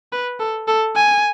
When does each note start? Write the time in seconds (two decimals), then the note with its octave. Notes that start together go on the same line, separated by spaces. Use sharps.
0.12 B4
0.39 A4
0.68 A4
0.96 G#5